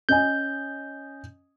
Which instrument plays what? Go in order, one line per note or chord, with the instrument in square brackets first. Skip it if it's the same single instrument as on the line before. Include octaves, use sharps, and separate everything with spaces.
[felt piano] C#4 D#5 G#5 [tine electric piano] G6